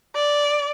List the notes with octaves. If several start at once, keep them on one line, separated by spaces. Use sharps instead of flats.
D5